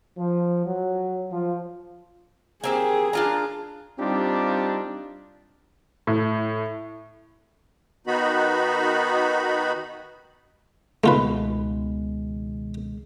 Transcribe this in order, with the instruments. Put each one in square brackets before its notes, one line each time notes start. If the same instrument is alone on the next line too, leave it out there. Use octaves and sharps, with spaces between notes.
[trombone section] F3
F#3
F3
[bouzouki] A#3 C4 G4 [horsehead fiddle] G#4
[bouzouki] D4 F4 A#5
[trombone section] G3 C4 D4 D#4 F4 G4
[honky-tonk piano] A2
[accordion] D#3 B3 D#4 F#4 B5
[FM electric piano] C#2 B2 D#3 [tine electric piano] G#3 [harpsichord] A3 F4 B4